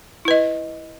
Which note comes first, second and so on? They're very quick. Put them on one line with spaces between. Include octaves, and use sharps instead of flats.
E4 B4 D#5